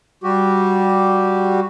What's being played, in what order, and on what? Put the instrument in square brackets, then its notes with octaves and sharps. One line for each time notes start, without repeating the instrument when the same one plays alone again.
[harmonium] G3 F#4 G4